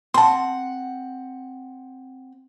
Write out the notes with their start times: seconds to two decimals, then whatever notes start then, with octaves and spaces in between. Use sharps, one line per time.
0.14 C4 F#5 A5 C6